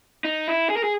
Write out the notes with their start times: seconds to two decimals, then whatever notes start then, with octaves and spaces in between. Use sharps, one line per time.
0.25 D#4
0.48 E4
0.70 G#4
0.77 A#4
0.84 G#4